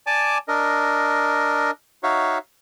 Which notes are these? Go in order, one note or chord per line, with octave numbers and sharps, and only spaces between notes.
D5 G#5 A5 D6
D4 A#4 D#5
D#4 F#4 C#5 E5 F5